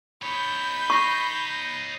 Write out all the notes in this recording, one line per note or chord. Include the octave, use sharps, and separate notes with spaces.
D#4 C#5 B5 G6
C#6 A#6 C7 D#7